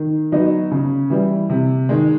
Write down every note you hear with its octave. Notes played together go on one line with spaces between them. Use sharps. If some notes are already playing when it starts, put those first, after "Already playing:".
Already playing: D#3
F#3 B3 D#4
C#3
E3 G3
C3
D#3 G#3